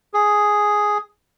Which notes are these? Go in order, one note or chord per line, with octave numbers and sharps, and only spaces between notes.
G#4